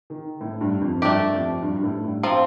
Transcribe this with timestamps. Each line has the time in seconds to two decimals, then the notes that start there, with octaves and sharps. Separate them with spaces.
0.10 D#3
0.41 A2
0.61 G2
0.81 F2
1.02 G2 A3 D4 G4
1.32 F2
1.62 G2
1.75 G2
1.84 A2
2.03 G2
2.23 F3 C4 F4